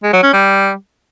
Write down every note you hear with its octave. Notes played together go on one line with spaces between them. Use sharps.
G#3
F#3
C#4
G3